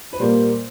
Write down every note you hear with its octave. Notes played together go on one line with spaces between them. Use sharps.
B4
A#2 G3 A#3 C5